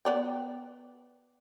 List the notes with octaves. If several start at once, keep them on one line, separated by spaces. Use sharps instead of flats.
B3 D5 G5